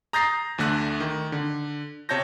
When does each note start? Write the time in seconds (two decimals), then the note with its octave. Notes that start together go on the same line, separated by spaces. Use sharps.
0.13 A#5 D#6 G6 A6 A#6 C7
0.58 D2 D3 A3 F#6
1.00 D#3
1.32 D3
2.09 C3 C#5 A5 G6 A#6